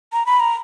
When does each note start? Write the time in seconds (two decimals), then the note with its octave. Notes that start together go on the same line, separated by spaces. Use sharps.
0.13 A#5
0.26 B5
0.40 A#5